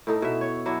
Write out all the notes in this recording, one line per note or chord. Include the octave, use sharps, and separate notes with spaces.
A2 D#4 A4
B2 E5
C#5
F#3 D4 E4